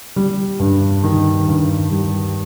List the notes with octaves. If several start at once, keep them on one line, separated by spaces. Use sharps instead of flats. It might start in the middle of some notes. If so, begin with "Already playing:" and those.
G3
G2
D#3
G2
G3